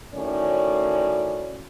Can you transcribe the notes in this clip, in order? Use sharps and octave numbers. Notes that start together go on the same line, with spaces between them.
A2 D#3 C#4 F#4 C#5 D5